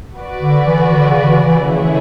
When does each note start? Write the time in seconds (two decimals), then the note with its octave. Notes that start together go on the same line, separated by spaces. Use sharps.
0.16 F#4 B4 D5
0.41 D3
0.66 E3
0.90 D3
1.08 C#3
1.28 E3
1.46 E3
1.64 C#3 A3 C#4 E4 G#4 C#5